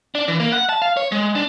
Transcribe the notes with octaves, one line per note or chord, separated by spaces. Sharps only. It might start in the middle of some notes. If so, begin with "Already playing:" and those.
D4
E3
A#3
F#5
A5
F5
C#5
G#3
D4